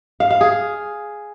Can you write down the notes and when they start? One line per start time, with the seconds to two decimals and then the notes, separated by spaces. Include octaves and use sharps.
0.20 F5
0.30 F5
0.41 G#4